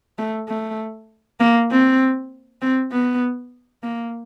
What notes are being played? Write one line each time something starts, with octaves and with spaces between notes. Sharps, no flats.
A3
A3
A#3
C4
C4
B3
A#3